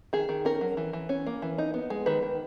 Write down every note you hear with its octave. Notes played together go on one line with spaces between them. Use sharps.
D#3 G#4
D#3
C#4 A#4
F#3
E3
E3
C#4
A#3
E3
D#4
B3
G#3
D#3 B4
D#3